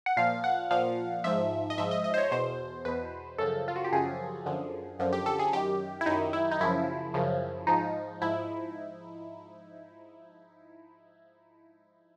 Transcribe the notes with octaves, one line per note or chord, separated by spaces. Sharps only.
F#5
A#2 F3 F5
F#5
A#2 F3 F5
G#2 F3 E5
D#5
G#2 F3 E5
D#5
D#5
C5
C#5
E2 B2 C5
E2 B2 B4
F#2 C#3 F3 A4
F4
F#4
G4
F#2 C#3 F3 G#4
F#2 D3 F3
F#2 D3 F3
G4
A4
G#4
F#2 D#3 G4
E4
F#2 D#3 D#4
E4
D#4
F#2 C#3 F3 E4
F#2 C#3 F3
G#2 F3 D#4
G#2 F3 E4